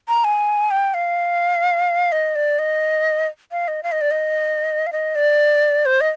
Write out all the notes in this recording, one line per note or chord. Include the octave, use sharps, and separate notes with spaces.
A#5
G#5
G5
F5
D#5
D5
D#5
F5
D#5
F5
D#5
D5
D#5
F5
D#5
D5
C5
D#5